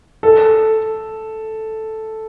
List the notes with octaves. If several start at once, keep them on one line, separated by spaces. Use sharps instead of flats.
A4